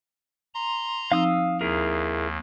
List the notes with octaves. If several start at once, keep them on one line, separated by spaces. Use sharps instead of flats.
A#5 C6
F3 C4 D#4 F5 D#6 E6
D#2 E4 G#4 A#4